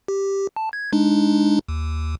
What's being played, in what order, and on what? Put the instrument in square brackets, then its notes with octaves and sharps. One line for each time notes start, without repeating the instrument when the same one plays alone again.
[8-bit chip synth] G4
A5
G#6
G#3 D4 D#4
D#2